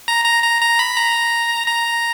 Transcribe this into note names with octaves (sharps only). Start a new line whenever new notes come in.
A#5
A#5
A#5
A#5
B5
A#5
A#5